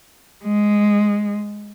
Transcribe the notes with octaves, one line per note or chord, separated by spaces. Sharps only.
G#3